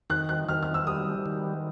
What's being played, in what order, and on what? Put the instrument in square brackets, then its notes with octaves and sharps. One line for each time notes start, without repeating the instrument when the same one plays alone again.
[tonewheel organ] D#3 [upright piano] F#6
[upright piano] F#6
[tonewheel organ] D#3 [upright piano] F6
[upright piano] F6
E6
[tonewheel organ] G3 [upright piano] D#6
[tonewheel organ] D#3